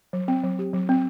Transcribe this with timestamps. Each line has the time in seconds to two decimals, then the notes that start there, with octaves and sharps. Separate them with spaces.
0.13 F#3
0.28 C4
0.44 F#3
0.59 G4
0.74 F#3
0.89 C4